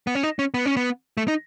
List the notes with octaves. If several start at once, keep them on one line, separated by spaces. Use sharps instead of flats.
B3
C#4
D#4
C#4
B3
C#4
B3
A3
D#4